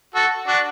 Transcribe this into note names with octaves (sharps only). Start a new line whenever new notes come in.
F#4 A4
D4 F#4